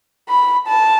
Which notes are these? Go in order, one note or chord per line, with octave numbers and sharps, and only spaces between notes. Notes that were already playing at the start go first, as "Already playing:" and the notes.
B5
A5